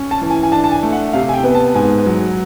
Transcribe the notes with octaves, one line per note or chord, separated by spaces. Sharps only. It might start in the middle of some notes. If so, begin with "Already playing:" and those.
Already playing: C#4
A5
E3
G#5
G#5
D4 A5
A5
G#5
A3
F#5
C3 F5
G#5
G5
B3
A5
G#2 G#5
F#3